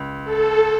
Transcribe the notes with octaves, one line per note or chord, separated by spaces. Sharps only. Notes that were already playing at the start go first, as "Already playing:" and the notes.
Already playing: C#2
A4